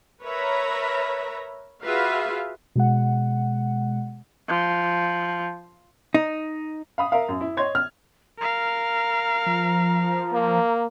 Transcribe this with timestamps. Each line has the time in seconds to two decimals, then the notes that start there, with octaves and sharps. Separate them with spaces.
0.23 A#4 B4 C#5 E5 A#5 B5
1.83 F4 F#4 G#4 B4 E5 F5
2.75 B2 G#3 F#5
4.49 F3
6.14 D#4
6.98 F5 B5 D#6
7.12 A#4 E5 F5
7.29 F#2
7.41 E4
7.57 C#5 D#5 C6 G#6
7.75 F6
8.39 A#4 F5 A#5
9.46 F3
10.33 A#3